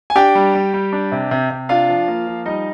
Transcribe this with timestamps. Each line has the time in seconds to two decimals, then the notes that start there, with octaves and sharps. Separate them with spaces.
0.10 G#5
0.16 D4 G4 G5
0.35 G3
0.55 G3
0.74 G3
0.93 D4
1.12 C3
1.31 C3
1.50 C3
1.69 D4 F4 F5
1.88 F3
2.08 A#3
2.27 F3
2.46 G3 D#4 D#5